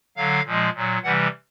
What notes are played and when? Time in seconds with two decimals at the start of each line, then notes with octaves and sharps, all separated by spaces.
0.17 D3 F#3 F5
0.46 A#2 F3 G#3
0.75 A#2 F#3
1.03 C3 E3 G3 F#5